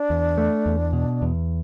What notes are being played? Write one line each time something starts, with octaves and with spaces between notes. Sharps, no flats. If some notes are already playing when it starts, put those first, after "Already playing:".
Already playing: D4
E2
A3
E2
B2
E2